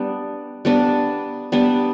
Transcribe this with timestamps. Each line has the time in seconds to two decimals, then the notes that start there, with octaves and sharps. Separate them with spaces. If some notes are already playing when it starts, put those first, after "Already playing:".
Already playing: G3 B3 D4
0.65 G3 B3 D4
1.52 G3 B3 D4